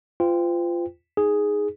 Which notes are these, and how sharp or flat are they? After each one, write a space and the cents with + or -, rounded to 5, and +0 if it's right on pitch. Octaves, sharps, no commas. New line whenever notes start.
F4 -15 C5 -45 G5 +15
D#4 +0 G#4 +0